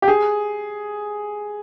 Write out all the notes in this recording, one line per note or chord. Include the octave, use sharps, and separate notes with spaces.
G4
G#4